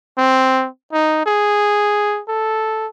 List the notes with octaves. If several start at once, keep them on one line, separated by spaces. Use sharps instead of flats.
C4
D#4
G#4
A4